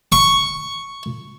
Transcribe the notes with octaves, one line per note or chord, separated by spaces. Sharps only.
C#6